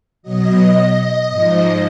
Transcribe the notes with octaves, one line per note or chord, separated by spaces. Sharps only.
B2 F#3 D#5
G#2 F3